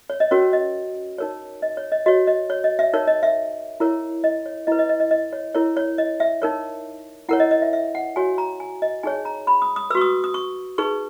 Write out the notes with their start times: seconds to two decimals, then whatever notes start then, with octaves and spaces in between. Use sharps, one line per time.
0.10 C#5
0.20 D#5
0.31 C#4 F#4 A#4 C#5
0.53 D#5
1.18 D#4 A#4 C#5
1.62 D#5
1.77 C#5
1.92 D#5
2.06 F#4 C#5 D#5
2.27 D#5
2.50 C#5
2.64 D#5
2.79 E5
2.93 D#4 A#4 C#5
3.08 D#5
3.23 E5
3.80 E4 A#4 C#5
4.24 D#5
4.46 C#5
4.67 E4 B4 D#5
4.79 D#5
4.89 D#5
5.00 D#5
5.11 D#5
5.33 C#5
5.55 E4 A#4 C#5
5.77 C#5
5.98 D#5
6.20 E5
6.42 D#4 A#4 C#5
7.29 E4 A#4 C#5 F#5
7.40 D#5
7.51 D#5
7.62 E5
7.73 E5
7.95 F#5
8.16 F#4 C#5 G#5
8.38 A#5
8.60 G#5
8.82 D#5
9.03 D#4 G#4 C#5 G#5
9.25 A#5
9.47 B5
9.62 D#6
9.76 D#6
9.90 B4 E6
9.95 F#4 C#6
10.01 D#6
10.24 D#6
10.34 C#6
10.78 D#4 G#4 B4 C#6